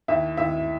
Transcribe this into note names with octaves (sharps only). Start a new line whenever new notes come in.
D#2 E4 E5
D#2 E4 E5